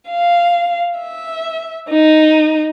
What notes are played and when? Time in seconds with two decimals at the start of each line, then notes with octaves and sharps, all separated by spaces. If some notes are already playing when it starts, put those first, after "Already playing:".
0.10 F5
0.98 E5
1.89 D#4